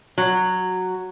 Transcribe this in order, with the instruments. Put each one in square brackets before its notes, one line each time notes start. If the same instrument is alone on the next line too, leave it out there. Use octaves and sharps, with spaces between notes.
[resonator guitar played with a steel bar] F#3